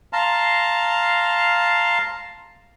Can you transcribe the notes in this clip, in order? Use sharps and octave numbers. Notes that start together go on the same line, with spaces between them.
F5 A5 A#5 C6